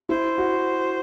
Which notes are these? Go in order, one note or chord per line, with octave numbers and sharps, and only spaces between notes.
E4 C5
F#4